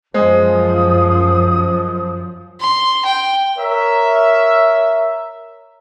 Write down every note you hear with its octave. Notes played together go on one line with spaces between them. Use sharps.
F#2 F3 G#3 C5 G#5 D#6
C6
G5
A#4 C#5 E5